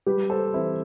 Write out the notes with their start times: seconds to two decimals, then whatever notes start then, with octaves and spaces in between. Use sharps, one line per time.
0.06 G3 G4 B4
0.30 A4 C5
0.53 E3 C4 E4